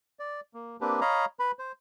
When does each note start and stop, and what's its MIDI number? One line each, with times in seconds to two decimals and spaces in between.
0.19 0.40 74
0.54 0.77 58
0.81 1.00 58
0.81 1.00 60
0.81 1.00 62
0.81 1.00 67
0.81 1.00 71
1.01 1.25 73
1.01 1.25 75
1.01 1.25 77
1.01 1.25 82
1.01 1.25 83
1.39 1.51 71
1.39 1.51 83
1.59 1.72 72